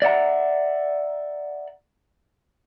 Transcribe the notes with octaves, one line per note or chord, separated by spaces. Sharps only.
D5 E5 F#5 A#5